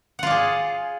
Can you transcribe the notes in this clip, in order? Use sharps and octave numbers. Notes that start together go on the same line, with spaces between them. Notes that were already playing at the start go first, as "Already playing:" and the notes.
F4 G#4 D5 F#5